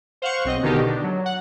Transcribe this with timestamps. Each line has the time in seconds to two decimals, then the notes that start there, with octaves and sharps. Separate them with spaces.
0.22 C5 F5 F#5 C#6
0.45 B1 C4 D#5
0.63 B2 D3 D#3 D#4 G4
0.86 D4
1.04 F#3
1.26 F#5